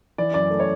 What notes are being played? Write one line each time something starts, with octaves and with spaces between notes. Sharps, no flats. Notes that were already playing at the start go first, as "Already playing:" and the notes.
E3 D5
F#2 D5
A3
C#5